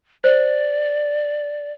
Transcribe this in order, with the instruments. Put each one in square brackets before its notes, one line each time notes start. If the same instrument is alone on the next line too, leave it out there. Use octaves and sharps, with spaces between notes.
[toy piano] C5 [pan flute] D5